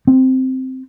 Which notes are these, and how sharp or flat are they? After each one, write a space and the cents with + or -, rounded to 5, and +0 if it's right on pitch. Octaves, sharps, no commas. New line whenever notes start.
C4 -5